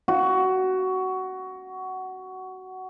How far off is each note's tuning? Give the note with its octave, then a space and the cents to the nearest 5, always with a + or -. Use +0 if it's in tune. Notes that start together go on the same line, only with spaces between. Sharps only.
F#4 +15